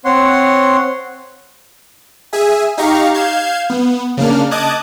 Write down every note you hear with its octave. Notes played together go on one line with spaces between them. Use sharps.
C4 C#5 F#5 C6
G#4 E5 G#5
D#4 G4 F5 A#5 C#6
F5 G6 G#6 C7 E7
B3
C#3 A#3 D4 F6
D#5 A5 D6 D#6 F#6 G#6